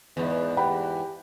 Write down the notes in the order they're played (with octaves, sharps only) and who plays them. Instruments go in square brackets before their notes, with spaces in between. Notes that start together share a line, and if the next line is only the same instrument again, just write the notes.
[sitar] E2 G#2 [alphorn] B3
[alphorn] G4 [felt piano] F#5 G5 B5